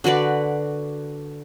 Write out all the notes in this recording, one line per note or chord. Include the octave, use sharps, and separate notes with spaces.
D3 F#4 B4 D5